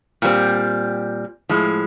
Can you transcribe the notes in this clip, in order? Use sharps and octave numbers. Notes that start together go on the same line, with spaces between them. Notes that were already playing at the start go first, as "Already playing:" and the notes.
A#2 G3 C4
A2 F3 G#3